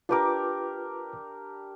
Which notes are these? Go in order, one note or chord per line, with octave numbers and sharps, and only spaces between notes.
D4 F4 G4 A#4 B4 D6